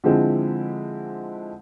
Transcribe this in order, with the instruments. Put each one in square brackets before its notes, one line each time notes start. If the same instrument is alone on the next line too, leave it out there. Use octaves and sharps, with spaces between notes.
[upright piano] D3 F3 G#3 C4 E4